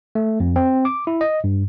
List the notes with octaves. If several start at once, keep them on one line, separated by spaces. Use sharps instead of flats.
A3
F2
C4
D6
E4
D#5
G2